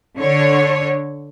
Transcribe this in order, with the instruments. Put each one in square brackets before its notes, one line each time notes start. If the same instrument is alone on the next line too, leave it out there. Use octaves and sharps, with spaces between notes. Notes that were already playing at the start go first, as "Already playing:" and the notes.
[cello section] D3 C#5